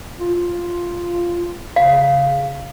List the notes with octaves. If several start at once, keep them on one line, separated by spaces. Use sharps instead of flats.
F4
C#3 F5